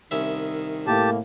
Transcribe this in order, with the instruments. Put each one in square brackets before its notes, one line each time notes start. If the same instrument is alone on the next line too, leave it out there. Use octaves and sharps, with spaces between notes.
[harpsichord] C2 C#4 E5 [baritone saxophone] D#3
[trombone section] A2 A#3 [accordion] G4 A5